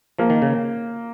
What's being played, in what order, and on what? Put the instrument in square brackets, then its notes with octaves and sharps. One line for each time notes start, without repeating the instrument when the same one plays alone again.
[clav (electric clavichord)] F3 [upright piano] A#3
[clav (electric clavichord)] D#3
C#3